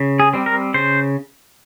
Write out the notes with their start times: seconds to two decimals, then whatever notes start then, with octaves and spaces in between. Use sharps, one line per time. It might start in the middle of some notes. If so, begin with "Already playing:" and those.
Already playing: C#3
0.20 G#4
0.33 G3 C4
0.46 A#4
0.74 C#3 C5